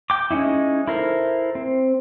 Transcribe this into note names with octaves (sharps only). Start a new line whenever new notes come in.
G5 D6
G#3 C#4 D#4 E4
E4 A4 A#4 C5
C4